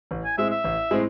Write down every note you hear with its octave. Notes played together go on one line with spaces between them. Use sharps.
A1
G#5
A2 G#3 C4 G#4 E5
E5
A1
A2 G#3 C4 G#4